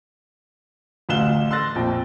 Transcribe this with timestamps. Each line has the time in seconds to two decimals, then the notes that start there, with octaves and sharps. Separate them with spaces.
1.09 A1 D2 F4 F#6 E7 G7
1.51 C6 E6 F#6 A6 A#6
1.75 A#1 F2 G5